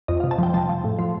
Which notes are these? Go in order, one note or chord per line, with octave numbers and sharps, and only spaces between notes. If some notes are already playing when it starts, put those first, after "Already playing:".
F2 D#5
C3 F5
A5
F3 G5
F3 A5
F3
A2
F3